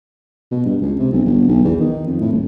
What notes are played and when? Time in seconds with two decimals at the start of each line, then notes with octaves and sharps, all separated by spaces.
0.51 B2
0.65 G2
0.81 C#2
0.99 C3
1.12 B1
1.25 G1
1.48 B1
1.64 E2
1.80 D#3
2.06 F2
2.20 A2
2.32 D#1